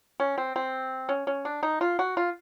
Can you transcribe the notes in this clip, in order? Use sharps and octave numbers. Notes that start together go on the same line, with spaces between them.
C#4
C4
C4
C#4
C#4
D4
D#4
F4
F#4
F4